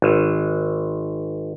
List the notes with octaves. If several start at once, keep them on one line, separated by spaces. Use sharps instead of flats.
G#1